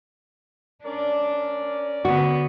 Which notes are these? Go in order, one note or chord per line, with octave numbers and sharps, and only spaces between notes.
C#4 D4 A#4 D5
D3 B3 F#4